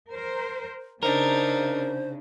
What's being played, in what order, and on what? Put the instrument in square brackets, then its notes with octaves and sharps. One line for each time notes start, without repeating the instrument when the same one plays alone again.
[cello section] A#4 C5
[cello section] C#3 [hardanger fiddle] D4 D#4 [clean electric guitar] A#4 [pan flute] C5